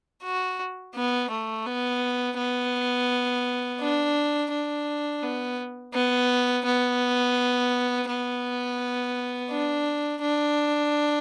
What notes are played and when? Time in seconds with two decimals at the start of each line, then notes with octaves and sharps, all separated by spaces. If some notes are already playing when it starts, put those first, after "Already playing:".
0.24 F#4
0.95 B3
1.31 A3
1.66 B3
2.38 B3
3.80 D4
4.51 D4
5.23 B3
5.94 B3
6.65 B3
8.08 B3
9.50 D4
10.22 D4